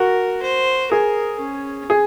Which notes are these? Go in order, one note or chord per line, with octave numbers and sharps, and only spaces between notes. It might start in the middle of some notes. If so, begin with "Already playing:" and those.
Already playing: F#4 A#4
C5
G#4 A#4
C#4
G#4